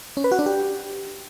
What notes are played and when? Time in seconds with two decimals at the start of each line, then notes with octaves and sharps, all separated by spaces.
0.17 C#4
0.24 B4
0.32 F#4
0.39 D4
0.46 G4